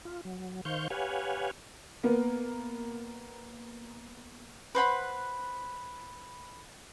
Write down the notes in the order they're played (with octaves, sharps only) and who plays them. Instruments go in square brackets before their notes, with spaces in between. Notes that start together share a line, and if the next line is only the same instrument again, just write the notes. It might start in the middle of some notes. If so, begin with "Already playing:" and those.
[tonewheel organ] F4
F#3
D#3 C5 F5 C#6 G6
G4 B4 C#5 F5 F#5 G#5
[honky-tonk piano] A#3 B3
[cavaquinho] B4 C5 F#5 B5